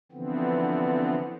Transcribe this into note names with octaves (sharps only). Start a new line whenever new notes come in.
D3 E3 F3 B3 C4